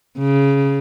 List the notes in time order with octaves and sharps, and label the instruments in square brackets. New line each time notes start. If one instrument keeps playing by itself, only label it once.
[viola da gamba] C#3